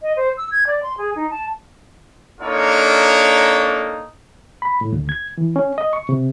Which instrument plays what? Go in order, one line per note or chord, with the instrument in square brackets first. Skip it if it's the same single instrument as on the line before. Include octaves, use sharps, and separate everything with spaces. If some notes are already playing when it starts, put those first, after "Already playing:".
[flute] D#5
C5
E6
G#6
D5
C6
G#4
D#4
A5
[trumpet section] A#3 D4 D#4 F4 A4 C#5
[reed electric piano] B5
A2
D2
G#6
E3
C#4
D#5
C#6
C3